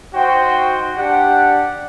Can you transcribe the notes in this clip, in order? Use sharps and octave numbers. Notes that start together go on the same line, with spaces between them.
D#4 F#4 C5 G5
D4 G4 D5 F#5